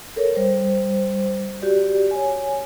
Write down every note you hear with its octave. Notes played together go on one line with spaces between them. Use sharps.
A4 A#4 C#5
G3 C5
F#4 G4 D5
C#5 G#5